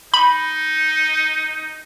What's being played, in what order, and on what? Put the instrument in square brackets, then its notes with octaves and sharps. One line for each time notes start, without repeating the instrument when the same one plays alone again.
[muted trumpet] D#4 [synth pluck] B5